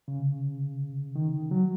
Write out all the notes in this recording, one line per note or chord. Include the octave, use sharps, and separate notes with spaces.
C#3
D#3
F#3